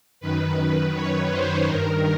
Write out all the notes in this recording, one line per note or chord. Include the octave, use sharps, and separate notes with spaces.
F#2 D#3 B4
C#5
C5
G2 D#3 A#4